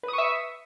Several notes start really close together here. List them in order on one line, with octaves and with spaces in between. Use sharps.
B4 D#6 C#6 E5